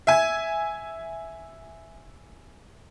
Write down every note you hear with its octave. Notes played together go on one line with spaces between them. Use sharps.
E5 G#5